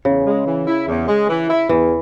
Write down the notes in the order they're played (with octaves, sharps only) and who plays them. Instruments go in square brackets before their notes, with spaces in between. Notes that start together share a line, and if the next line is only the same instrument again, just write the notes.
[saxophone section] E2 [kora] C#3
[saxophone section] G#3
E3
E4
E2
G#3
E3
E4
[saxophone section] E2 [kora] E3